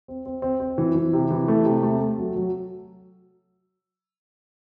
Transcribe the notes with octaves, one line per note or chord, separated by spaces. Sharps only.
C4
C4
C4
C4
E3
E3
C3
E3
A3
C3
A3
A3
F#3
F#3